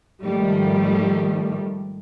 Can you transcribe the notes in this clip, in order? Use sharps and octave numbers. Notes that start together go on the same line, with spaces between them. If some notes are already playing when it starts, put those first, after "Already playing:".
G#2 D#3 F3 G3 A3